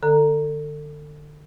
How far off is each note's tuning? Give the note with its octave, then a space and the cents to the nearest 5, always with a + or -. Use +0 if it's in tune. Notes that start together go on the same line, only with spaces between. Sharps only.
D3 +25 A4 +30 A#5 +0